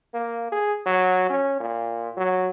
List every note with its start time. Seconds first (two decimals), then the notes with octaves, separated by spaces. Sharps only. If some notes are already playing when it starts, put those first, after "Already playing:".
0.14 A#3
0.52 G#4
0.86 F#3
1.30 C#4
1.60 A#2
2.17 F#3